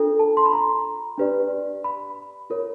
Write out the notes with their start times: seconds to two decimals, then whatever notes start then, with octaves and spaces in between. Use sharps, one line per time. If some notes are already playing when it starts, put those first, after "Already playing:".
Already playing: D4 F4 A4
0.19 A5
0.37 C6
0.46 B5
0.53 A#5
1.18 D4 G4 B4 D5
1.84 B5
2.50 F4 A#4 C#5